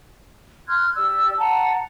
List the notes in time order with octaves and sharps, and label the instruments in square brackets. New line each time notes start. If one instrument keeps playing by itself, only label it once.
[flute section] C6 F6 F#6 G#6
G4 D5 E6
F#5 A5 A#5